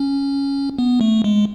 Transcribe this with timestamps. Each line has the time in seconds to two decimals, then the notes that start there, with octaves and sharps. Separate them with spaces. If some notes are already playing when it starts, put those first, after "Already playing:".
Already playing: C#4
0.78 B3
1.01 A3
1.24 G#3